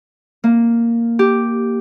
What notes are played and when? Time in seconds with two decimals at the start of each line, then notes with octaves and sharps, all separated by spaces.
0.44 A#3
1.19 G4